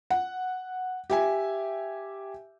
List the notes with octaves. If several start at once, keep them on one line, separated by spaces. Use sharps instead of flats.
F#5
G4 E5 G#5